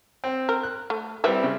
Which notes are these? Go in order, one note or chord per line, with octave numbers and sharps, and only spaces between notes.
C4
A#4
F#6
A3
G3 C4 E4 B4 E5
C#3